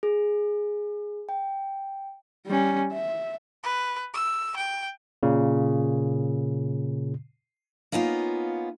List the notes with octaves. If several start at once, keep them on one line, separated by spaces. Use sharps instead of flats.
G#4
G5
G3 C#4
E5
B4
E6
G5
A#2 C#3
A#3 B3 C#4 D#4 F4